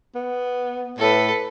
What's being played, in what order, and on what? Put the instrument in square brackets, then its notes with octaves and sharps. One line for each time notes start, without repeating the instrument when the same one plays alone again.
[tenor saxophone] B3
[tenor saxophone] A2 [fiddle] A4 B4